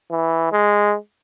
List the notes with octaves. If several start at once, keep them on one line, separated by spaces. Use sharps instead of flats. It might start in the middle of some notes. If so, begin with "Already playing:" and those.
E3
G#3